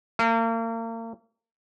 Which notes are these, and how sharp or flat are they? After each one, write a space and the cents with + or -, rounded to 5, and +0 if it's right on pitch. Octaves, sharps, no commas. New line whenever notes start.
A#3 -40